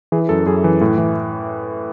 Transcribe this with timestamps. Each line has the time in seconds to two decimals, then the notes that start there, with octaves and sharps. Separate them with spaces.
0.12 E3 G#4
0.29 F#2 A4
0.46 F#2 G#4
0.64 E3
0.81 A2
0.98 E3